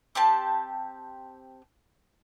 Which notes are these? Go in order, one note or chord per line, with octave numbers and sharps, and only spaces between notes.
C4 G4 A5